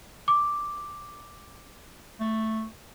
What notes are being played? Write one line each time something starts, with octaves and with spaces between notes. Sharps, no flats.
D6
A3